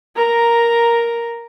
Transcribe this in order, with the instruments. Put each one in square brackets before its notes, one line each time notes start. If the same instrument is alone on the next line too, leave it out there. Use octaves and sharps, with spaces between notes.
[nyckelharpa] A#4 A#5